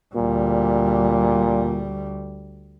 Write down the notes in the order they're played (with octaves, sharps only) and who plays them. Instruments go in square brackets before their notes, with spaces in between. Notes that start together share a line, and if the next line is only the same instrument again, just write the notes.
[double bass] D2 G3 [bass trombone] A#2